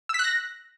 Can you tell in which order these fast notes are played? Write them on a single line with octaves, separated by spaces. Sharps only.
E6 B6 F#6 A#6